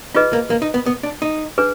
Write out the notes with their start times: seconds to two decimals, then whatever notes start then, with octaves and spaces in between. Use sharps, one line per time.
0.15 D#4 F4 G#4 B4 D#5
0.33 A#3
0.50 A#3
0.62 D#4
0.74 B3
0.86 B3
1.03 D4
1.22 D#4
1.58 D4 G#4 B4